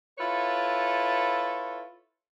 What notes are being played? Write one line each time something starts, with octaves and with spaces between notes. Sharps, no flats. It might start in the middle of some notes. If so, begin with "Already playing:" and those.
E4 F4 A4 B4 C#5